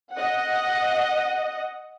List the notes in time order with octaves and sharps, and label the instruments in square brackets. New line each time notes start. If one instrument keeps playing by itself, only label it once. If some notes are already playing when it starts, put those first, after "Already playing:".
[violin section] D#5 F#5